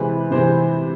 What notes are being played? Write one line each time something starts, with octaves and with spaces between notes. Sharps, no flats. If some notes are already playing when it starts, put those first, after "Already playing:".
Already playing: C3 E3 G#3 C4 B4
C3 E3 G#3 C4 C5